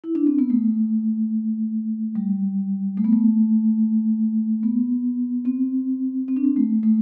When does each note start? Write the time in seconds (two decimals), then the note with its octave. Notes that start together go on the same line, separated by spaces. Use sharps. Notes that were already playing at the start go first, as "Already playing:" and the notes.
0.04 E4
0.15 D4
0.27 C4
0.39 B3
0.50 A3
2.15 G3
2.97 A3
3.04 B3
3.13 A3
4.63 B3
5.45 C4
6.28 C4
6.36 D4
6.44 C4
6.56 A3
6.83 A3